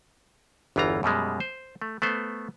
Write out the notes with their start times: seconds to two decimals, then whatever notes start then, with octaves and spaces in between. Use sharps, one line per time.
0.76 G1 E2 E3 F4 A#5
1.03 F#2 B2 G3 G#3
1.40 C5
1.82 A3
2.02 A3 B3 C5